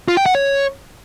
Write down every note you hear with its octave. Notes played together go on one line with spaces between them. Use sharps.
F4
G5
F#5
C#5